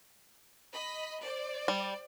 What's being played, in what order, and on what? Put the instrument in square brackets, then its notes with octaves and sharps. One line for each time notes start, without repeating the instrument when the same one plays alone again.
[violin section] D#5 B5
C5 D5
[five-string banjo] G3